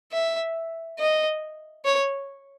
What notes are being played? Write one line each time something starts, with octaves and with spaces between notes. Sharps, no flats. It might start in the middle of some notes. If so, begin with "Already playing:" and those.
E5
D#5
C#5